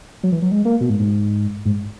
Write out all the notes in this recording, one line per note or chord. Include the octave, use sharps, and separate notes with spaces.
F#3
E3
F#3
G#3
A#3
B2
G#2
G#2
G#2